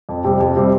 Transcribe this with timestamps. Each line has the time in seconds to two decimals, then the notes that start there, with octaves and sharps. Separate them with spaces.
0.09 F2
0.24 C3 G3 C4
0.40 F2
0.56 C3 G3 C4